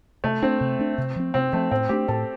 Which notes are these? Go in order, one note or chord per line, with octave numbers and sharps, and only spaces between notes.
C3 A3
A3 C4 D4
C3
A3 D4
C3
F3 C4
C3 C4
F3 A3 C4
A2 C4
A3 D4 G4
A2 A4